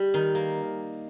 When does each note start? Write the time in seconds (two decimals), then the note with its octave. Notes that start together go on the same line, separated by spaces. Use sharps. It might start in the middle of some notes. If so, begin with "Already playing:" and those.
Already playing: G3
0.14 D#3 D#4
0.35 A#3